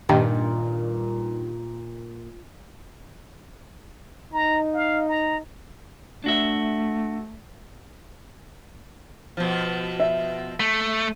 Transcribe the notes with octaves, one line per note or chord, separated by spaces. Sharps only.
G2 A#2 D#3
D#4 A#5
F5
A#5
A3 D4 F#4 E5
B2 F3
E5
A3